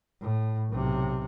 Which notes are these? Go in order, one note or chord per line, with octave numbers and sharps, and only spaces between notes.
A2
B1 C3